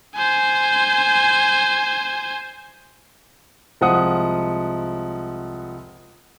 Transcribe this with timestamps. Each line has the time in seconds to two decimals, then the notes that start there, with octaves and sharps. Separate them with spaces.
0.17 C5 G#5
3.81 C2 F3 G#3 F#5 D#6